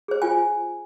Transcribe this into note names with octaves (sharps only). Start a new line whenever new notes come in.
G#4 C5
F4 G#5